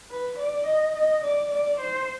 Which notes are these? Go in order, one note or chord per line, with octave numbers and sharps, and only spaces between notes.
B4
D5
D#5
D#5
D5
D5
C5